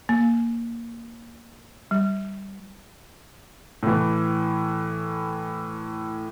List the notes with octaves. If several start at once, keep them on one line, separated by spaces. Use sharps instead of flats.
A#3
G3
A2 E3